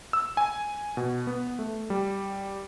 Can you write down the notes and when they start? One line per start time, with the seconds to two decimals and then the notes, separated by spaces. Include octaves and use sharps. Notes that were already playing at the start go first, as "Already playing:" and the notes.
0.13 E6
0.37 G#5
0.97 B2
1.27 B3
1.59 A3
1.90 G3